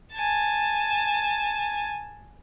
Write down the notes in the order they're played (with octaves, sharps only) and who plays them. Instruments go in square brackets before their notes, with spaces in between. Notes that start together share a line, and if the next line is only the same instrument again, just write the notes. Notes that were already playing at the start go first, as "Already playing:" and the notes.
[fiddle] G#5 A5